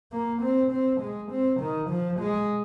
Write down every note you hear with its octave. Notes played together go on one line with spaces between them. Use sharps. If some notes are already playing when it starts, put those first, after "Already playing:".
A#3
C4
C4
G#3
C4
D#3
F3
G#3